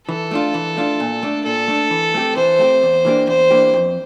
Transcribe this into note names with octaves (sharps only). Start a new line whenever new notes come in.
E3 A4
A3 D4 F4
E3
A3 D4 F4
A#2
A3 D4
A#2 A4
A3 D4
E3
A3 C4 G4
E3 C5
A3 C4 G4
E2
E3 A#3 D4 G4
E2 C5
E3 A#3 D4 G4
F2